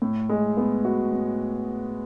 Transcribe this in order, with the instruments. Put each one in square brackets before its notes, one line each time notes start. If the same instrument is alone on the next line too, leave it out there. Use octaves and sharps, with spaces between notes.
[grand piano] A2
G#3
B3
F#4
A2